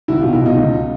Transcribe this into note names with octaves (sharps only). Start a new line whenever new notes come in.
C2 E4 F#4
B2 F4 G4
E4 F#4
B2 D#4 F4
C#2